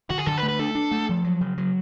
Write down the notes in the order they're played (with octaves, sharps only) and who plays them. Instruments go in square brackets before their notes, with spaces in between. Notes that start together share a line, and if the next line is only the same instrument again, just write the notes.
[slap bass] D3 [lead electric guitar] F#4
[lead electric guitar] G#4
[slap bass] D3 [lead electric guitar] A4
[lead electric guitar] B4
[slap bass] A3
[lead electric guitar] B4
[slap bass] D4 [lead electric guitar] A4
[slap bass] D4
A3
F3
F#3
C#3
F#3